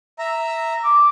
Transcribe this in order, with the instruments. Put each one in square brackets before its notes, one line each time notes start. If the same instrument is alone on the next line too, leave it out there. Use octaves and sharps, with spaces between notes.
[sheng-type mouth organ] E5 A#5
[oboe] D6